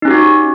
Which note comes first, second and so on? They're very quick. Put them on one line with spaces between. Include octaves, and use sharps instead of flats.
D#4 C#4 G4 F#4